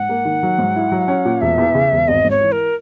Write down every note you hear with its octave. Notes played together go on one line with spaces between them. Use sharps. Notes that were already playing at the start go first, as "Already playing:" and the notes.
Already playing: G#2 F#5
A#3
D#3
F#3
G#2
E4
F#3
C#4
A#2
E1 E5
E2
C#3
E1
G#1 D#5
G#2
C#5
E3
A#4